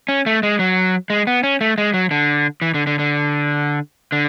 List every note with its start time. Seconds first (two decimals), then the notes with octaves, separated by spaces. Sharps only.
0.08 C#4
0.26 A3
0.43 G#3
0.59 F#3
1.10 G#3
1.27 B3
1.43 C#4
1.61 A3
1.78 G#3
1.94 F#3
2.11 D3
2.62 E3
2.74 D3
2.87 D3
2.99 D3
4.12 D3